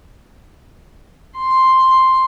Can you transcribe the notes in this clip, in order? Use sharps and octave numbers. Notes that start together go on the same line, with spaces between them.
C6